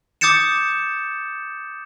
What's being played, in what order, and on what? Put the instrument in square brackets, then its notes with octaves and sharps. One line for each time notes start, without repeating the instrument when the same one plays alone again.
[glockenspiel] D6 D#6 G6 A6 C#7 E7